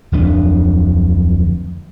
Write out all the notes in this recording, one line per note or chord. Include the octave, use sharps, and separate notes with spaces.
D1 F2 D4